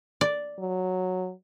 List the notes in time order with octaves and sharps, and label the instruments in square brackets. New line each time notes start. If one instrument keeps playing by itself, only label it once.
[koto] D5
[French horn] F#3